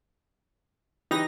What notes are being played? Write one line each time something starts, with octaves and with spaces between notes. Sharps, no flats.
E3 D#4 G4 B4 A#6